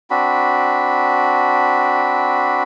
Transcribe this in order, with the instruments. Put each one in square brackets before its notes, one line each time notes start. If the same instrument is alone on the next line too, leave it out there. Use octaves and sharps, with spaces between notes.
[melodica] C4 D4 F#4 B5